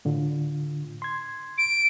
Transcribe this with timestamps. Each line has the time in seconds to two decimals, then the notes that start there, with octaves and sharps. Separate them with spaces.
0.05 A2 D3 F4
1.02 C6 G#6
1.58 D7